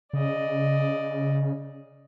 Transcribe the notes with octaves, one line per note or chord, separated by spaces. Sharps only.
C#3 D5 D#5